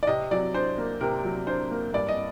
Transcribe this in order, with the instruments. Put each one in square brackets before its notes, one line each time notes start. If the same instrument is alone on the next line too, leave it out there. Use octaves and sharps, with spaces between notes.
[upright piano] D5
C3 D#5
F#3 D5
D4 C5
A#3
C3 A#4
F#3
D4 C5
A#3
G2 D5
D#5